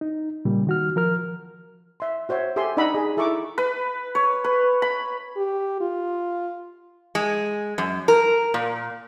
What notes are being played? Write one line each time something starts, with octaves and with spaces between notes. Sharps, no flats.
D#4
A#2 C#3 G3
D#3 F#4 F6
F3 A#4 F6
E5 C6
F#4 C5 C#5 E5
G4 A4 E5 G#5 C6
D4 D#4 D#5 F#5 B5 E6
G#4
E4 A4 E5 A#5 C#6 D6
B4
C#5
B4
B5
G4
F4
G#3
F#2
A#4
A#2